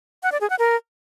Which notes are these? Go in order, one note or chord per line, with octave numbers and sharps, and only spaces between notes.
F#5
D5
G#4
F#5
A#4